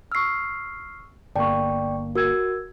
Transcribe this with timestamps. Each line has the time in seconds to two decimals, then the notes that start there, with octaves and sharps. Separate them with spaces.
0.12 C#6 E6 F6 C7
1.36 G1 A#3 D5 G5 A5 C#6
2.15 F#4 A#4 E6 G#6